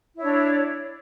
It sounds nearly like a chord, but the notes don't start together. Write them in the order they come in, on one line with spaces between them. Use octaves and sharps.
E4 C#5 D4